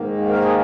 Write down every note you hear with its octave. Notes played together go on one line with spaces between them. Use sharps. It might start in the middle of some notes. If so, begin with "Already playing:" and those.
Already playing: G#2 D#3 A#3
A#4
G#4